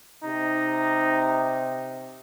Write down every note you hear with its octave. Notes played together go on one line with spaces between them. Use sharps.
C3 D#4